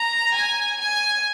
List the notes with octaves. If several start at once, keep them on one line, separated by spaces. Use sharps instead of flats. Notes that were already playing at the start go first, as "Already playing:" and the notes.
Already playing: A#5
G#5
G#5